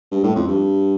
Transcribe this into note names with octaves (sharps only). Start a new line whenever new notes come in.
G2
A2
F2
G2